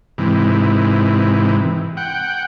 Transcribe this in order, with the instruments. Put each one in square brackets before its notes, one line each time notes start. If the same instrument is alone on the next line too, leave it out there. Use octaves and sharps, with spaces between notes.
[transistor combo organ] G#2 C3 E3
F#5 G5